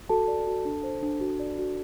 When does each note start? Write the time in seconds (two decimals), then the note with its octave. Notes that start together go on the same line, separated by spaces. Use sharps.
0.09 F#4 A4 A5
0.28 D5
0.47 F#4
0.65 D4
0.83 C5
1.03 D4
1.20 F#4
1.39 D5
1.58 F#4